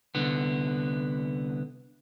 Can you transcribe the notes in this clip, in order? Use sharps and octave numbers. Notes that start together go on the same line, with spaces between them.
C2 D3 B3